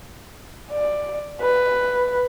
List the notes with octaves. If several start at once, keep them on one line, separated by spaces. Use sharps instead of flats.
D5
B4